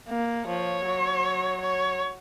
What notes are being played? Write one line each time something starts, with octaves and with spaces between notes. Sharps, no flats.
A#3
F3 C#5
F#3
C#5